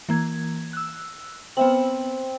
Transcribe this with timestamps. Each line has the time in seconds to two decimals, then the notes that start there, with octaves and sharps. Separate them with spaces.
0.09 E3 A#3 G#6
0.73 E6 F#6
1.57 B3 C4 E5 F#7